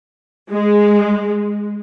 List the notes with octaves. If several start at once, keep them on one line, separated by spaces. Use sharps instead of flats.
G#3